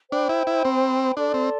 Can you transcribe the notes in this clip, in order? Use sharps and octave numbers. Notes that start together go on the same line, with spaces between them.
D4 C5 G5 B5
E4
E4
C4
D4 A4 D5 A5 C6
C4